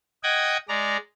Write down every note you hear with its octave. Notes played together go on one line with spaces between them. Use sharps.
D#5 F#5 G5 D#6 G#6
G#3 D5 A#5